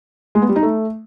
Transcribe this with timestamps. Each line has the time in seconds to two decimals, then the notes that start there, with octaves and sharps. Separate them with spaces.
0.35 G#3
0.42 B3
0.49 G3
0.56 D#4
0.63 A3